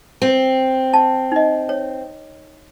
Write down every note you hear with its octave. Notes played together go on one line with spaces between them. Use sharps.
C4
A5
D#4 D#5
C#5